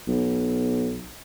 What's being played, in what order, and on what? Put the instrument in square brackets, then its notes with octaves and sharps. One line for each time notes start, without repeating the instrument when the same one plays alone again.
[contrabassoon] B1